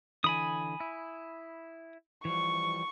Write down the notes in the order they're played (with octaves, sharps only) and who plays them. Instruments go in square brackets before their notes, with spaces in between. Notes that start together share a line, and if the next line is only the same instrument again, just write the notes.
[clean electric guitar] D3 E3 [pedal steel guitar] G#5 B5 D#6
[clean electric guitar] E4
[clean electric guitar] E3 F3 G3 [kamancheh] C#6